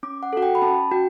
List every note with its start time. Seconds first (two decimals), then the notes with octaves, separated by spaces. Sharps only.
0.03 C#4 D6
0.23 F#5
0.33 F#4 A4 F#5
0.42 G5
0.55 B5
0.62 C#4 A5
0.91 F#4 G5